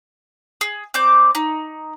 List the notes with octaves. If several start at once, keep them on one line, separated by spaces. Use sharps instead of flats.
G#4
C4 D5 D6 G6
D#4